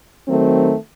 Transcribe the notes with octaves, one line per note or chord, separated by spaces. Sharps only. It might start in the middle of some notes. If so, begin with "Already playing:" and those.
D#3 F#3 A3 C4